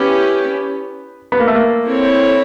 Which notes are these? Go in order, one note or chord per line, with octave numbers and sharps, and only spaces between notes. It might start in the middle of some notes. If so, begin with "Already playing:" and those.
Already playing: B3 C#4 E4 G4
B3
A#3
A3
A#3
C4 E4 A4 C#5